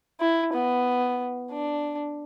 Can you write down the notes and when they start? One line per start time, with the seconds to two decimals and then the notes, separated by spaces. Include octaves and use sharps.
0.21 E4
0.53 B3
1.51 D4